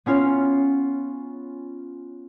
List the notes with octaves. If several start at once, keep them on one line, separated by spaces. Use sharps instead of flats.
B3 C#4 F4 C#5